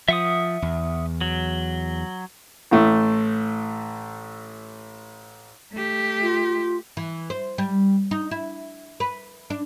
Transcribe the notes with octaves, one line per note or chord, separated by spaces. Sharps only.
F3 E5 F#5 D#6
E2
F#3
A1 A2 A3
A3 G4
F4
E3
C5
G3
D#4
E4
B4
D4